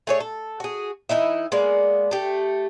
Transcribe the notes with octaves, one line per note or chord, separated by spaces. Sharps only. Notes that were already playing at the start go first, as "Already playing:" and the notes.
A3 G#4 C#5
A4
F#4 G#4
E3 D#4 E4 E5
G#3 A#3 B3 D5
A3 G4